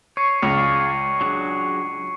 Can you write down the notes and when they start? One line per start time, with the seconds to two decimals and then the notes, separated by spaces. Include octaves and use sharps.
0.17 C#5 C#6 C7 C#7
0.42 C#2 G#4 D5 F5
1.21 F#3 D4 G#4